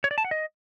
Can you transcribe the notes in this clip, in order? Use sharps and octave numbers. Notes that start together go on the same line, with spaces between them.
C#5
D5
A5
F#5
D#5